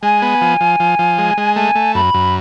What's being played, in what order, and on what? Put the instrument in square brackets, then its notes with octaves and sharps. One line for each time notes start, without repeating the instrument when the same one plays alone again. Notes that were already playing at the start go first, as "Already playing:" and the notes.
[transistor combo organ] G#3 [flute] G#5
[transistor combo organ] B3
F3
F3
F3
F3
G#3
G#3
[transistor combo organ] A3 [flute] G#5
[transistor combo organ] A3
[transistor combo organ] F#2 [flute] B5
[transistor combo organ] F#2